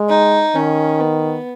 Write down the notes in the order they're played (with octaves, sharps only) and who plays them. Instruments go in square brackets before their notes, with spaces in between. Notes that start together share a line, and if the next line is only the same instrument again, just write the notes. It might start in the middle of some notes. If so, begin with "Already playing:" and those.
Already playing: [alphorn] G#3
[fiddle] D#4
[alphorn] D#3 [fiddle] C#4
[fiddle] B3